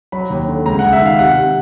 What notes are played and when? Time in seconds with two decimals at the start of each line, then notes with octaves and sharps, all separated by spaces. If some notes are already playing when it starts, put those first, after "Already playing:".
0.12 F#3 B5
0.30 D#2
0.48 D3
0.66 C#2 A#5
0.79 C#2 F#5
0.93 E5
1.02 D#3 F5
1.19 C3 F#5
1.37 C3